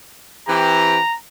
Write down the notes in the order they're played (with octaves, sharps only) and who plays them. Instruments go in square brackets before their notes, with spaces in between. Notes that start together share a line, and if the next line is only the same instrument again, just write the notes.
[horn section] E3 C4 G4 [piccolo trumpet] A#5